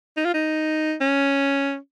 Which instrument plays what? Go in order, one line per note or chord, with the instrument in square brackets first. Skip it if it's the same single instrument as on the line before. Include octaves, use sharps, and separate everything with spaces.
[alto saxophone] D#4
F4
D#4
C#4